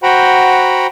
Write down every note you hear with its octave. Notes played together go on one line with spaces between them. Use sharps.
F#4 C5 F#5 G5 A#5 B5